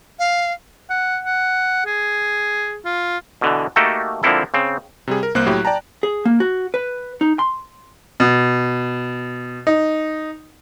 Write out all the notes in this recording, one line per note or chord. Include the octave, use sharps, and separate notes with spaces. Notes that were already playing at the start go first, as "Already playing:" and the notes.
F5
F#5
F#5
G#4
F4
B2 D3 E3
A3 A#3 D#4 F#4 G4 A4
D3 F3 A#3 C4 E4 A4
C#3 C4
C3 G3 G#4
A#4
C2 A#3 C5 F#6
A2 F#3 E4 G4
D5 G5 A5 A#5
G#4
A#3
F#4
B4
D#4
C6
B2
D#4